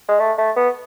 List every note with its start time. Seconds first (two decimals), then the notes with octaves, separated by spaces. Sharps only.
0.08 G#3
0.20 A3
0.38 A3
0.56 B3